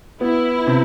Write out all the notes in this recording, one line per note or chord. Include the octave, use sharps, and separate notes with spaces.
B3 E4
C3